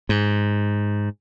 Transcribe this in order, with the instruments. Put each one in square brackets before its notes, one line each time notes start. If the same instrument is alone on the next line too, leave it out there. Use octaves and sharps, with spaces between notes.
[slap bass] G#2